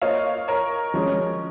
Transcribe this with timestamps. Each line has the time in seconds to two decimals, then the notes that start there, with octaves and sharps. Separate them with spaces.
0.02 A#3 F4 C5 C#5 D#5 F5
0.48 A#4 C#5
0.94 F3 G#3 C#4